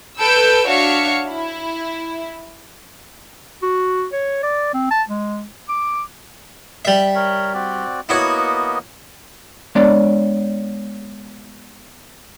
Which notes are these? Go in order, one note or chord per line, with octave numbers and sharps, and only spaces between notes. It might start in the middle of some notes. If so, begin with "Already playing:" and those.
A4 B4 E6 G6 D7
D4 F#4 C#5 E5 F5 C#7
E4
F#4
C#5
D5
C4
A5
G#3
D6
G3 E5
A#4 C#5
C4 F#4 D5
A#3 B3 E4 F#4 C#5 D#5
G#3 B3 D4 C#5 D5